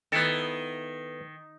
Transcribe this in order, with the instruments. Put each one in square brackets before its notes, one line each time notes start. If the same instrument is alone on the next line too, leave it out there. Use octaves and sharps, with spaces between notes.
[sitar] D#3 [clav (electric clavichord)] B3 E4 A4